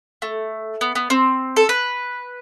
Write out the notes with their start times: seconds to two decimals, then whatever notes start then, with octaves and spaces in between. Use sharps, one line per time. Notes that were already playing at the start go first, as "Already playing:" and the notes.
0.22 A3
0.81 B3
0.95 B3
1.10 C4
1.56 A4
1.69 B4